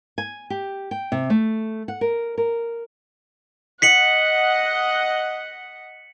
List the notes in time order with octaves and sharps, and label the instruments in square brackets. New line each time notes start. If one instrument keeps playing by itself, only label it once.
[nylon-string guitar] G#5
G4
G5
C3
A3
F#5
A#4
A#4
[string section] D#5 F#5 [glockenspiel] B6 C#7 F#7